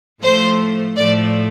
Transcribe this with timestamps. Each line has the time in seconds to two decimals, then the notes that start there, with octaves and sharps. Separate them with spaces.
0.22 A2 F3 A3 C5
0.96 A2 F3 A3 D5